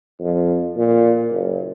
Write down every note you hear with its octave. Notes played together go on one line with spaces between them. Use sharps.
F2
A#2
F#1